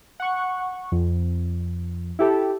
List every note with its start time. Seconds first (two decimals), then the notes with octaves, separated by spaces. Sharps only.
0.20 F#5 C#6
0.92 F2
2.19 E4 G4 A4